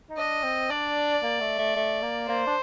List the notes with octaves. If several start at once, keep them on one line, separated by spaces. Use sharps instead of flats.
D#4
D4 D#5
C4
D4 D5
A#3
A3
A3
A3
A#3
A#3 C5
D4